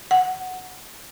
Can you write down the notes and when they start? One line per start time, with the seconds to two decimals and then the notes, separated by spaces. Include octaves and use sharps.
0.11 F#5